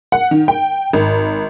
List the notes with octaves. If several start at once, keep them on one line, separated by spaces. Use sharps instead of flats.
F#5
D#3
G5
G#1